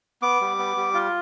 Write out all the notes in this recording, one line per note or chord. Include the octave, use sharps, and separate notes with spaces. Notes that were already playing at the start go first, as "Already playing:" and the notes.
B3 D6
G3
B3
G3
F4